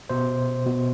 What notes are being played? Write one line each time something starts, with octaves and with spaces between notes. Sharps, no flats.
B2 C5
B2